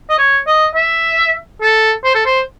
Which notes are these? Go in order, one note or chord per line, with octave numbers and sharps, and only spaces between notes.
D#5
C#5
D#5
E5
A4
C5
A4
C5